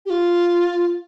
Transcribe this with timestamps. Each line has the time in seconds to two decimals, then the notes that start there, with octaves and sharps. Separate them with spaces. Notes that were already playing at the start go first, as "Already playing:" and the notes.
0.06 G4
0.10 F4